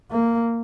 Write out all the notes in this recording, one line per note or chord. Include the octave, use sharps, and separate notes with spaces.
A#3